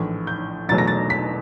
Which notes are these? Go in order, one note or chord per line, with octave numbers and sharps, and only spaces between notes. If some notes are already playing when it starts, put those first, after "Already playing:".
Already playing: A#1 A2 E3
G6
E1 E2 B2 F#3 A3 A6
A#6
A6
B6